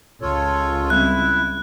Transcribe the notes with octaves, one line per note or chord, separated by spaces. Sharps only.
C#2 F4 A4 C#5
G3 C4 C#4 E4 F#6